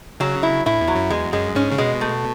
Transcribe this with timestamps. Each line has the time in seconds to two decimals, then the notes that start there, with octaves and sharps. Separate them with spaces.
0.20 C#3 F#3
0.43 E4
0.66 A2 E4
0.81 E2
0.88 F#3
0.95 F#2
1.10 E2 G#3
1.33 F#2 G#3
1.55 G#2 C#4
1.72 C#3
1.78 B2 G#3
2.01 A3